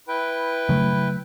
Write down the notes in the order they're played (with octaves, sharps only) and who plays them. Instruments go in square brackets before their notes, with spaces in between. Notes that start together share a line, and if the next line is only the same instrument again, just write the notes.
[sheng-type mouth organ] E4 B4 G5
[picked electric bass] C#3 F#3 A3